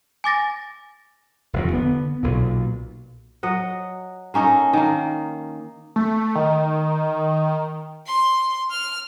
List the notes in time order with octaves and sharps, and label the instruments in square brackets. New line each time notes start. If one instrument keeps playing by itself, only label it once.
[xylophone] G#5 D6 A6 A#6
[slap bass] F1 E2
D3 B3
B1 A#2
[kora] F#3 D#5 F#5
A#3 C#4 D#4 A4
D#3 A#3
[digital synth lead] A3
D#3
[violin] C6
F6